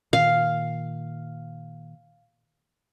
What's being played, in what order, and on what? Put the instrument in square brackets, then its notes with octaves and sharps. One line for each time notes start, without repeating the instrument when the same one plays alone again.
[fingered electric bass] A#2 D#3 [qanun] F5